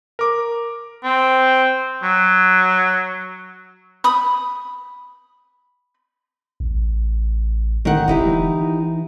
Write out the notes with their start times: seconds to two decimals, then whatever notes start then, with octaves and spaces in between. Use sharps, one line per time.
0.19 A#4 D6
1.04 C4
2.03 F#3
4.04 B5 D#6
6.60 A1
7.85 D3 D#3 F#5
8.08 E1 D#4 E4 G4
8.25 E3